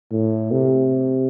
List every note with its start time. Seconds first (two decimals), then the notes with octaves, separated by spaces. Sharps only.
0.11 A2
0.51 C3